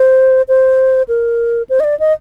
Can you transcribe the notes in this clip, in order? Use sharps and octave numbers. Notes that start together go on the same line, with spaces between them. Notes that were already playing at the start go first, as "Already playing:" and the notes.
Already playing: C5
C5
A#4
C5
D#5
D5
D#5